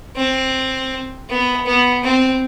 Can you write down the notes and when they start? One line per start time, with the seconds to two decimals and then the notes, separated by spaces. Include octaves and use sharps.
0.16 C4
1.29 B3
1.66 B3
2.04 C4